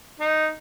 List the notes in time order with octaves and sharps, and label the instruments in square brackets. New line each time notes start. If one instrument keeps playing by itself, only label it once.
[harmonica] D#4